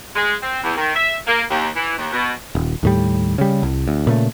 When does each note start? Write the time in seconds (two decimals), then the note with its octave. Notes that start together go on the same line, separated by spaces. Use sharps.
0.16 G#3
0.42 C4
0.63 E2
0.77 D#3
0.95 E5
1.27 A#3
1.50 D#2
1.76 E3
1.98 D#2
2.13 B2
2.55 D#1
2.83 D#2 A2 G3
3.38 C#3 G3
3.63 C2
3.88 D2
4.07 A#2 C#3 A3